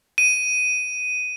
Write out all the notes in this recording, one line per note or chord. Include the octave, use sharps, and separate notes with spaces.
D#7